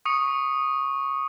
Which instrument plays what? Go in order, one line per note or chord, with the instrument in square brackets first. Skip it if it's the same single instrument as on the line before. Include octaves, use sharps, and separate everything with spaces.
[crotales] C#6 D#6 C#7